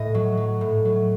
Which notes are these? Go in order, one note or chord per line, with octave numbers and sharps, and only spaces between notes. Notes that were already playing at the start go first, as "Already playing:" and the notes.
Already playing: A2 D#5
F#3
F#3
A2
F#3